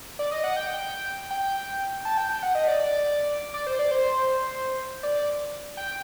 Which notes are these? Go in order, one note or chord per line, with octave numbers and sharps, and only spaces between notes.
D5
D#5
F#5
G5
G5
A5
G5
G5
F#5
D#5
D5
D5
D5
C5
D5
C5
D5
D5
G5